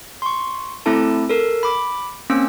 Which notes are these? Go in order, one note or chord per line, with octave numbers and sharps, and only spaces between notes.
C6 C#6
A3 C4 E4 A4 A5
A4 A#4
B5 D6
A#3 C4 C#4 E6